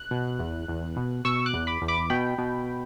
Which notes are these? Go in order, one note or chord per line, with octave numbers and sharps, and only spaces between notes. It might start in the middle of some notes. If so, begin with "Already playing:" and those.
Already playing: F#6
B2
E2
E2
B2
B2 C#6 E6
D6 F#6
E2
B5 D6
E2
B5 D6
B2 G5 B5
B2